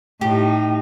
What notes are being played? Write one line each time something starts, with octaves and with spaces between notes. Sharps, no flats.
A2 D#4 G4